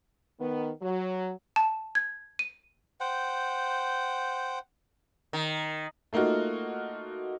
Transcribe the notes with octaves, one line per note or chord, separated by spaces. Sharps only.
D#3 B3
F#3
A5
G#6
D#7
C5 F#5 G5
D#3
A3 A#3 D#4 F4 F#4